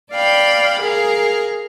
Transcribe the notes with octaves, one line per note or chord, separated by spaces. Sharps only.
D5 F5 G5 B5
G#4 A#4 F5